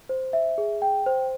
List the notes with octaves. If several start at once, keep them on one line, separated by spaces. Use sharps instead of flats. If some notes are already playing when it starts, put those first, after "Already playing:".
C5
E5
G#4
G5
C5